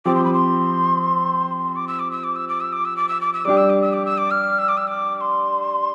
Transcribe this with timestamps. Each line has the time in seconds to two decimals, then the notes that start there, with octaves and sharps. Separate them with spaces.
0.05 F3 C4 G4 D6
0.15 C6
0.24 B5
0.33 C6
1.76 D6
1.88 E6
1.99 D6
2.11 E6
2.24 D6
2.36 E6
2.48 D6
2.61 E6
2.73 D6
2.85 E6
2.97 D6
3.09 E6
3.21 D6
3.34 E6
3.45 G3 D4 G4 D6
3.57 E6
3.70 D6
3.82 E6
3.93 D6
4.06 E6
4.18 D6
4.31 F6
4.59 E6
4.68 D6
4.77 E6
4.87 D6
5.16 D6
5.21 C6